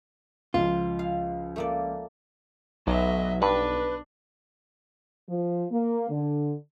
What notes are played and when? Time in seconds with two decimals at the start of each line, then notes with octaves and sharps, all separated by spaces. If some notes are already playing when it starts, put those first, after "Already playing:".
0.54 C#2 F3 F4
0.99 F5
1.56 A3 A#3 D5
2.87 B1 F#3 D#5 E5
3.42 G2 D4 B4
5.29 F3
5.70 A#3
6.10 D3